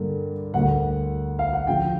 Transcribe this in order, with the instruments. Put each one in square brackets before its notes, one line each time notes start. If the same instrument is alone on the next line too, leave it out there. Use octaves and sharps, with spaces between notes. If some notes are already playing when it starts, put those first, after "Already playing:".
Already playing: [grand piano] G2 D3 G3 A#3
D2 D3 G3 A#3 F#5
F5
F#5
D2 C#3 F3 G5